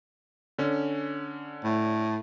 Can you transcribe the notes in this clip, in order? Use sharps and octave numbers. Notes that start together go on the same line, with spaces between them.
D3 C#4
A2